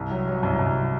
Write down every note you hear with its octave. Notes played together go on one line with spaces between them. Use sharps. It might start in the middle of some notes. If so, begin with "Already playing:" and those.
Already playing: C2
F#3
F#3
C2
C2